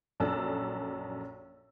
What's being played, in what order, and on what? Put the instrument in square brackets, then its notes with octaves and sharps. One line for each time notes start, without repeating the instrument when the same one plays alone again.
[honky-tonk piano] A#1 F#2 D4 A4 A5 E6